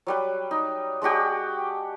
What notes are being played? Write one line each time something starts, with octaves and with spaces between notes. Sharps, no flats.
F#3 G3 B4
D#4
G#3 D4 F#4 G4